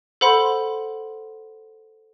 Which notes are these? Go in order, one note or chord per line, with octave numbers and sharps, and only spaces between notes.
A4 C5 F#5 B5 C6